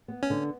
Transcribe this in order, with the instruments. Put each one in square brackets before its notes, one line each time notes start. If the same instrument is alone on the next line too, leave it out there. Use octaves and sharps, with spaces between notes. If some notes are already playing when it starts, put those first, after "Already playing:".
[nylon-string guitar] B3
[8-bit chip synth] C#4
[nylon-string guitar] D3